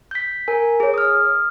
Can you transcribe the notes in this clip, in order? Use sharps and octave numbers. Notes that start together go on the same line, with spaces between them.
G6 B6
A#4 G#5
G#4 C#5
D#6 F6